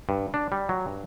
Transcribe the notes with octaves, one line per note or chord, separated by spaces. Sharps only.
G2
D4
G3
F#3
G2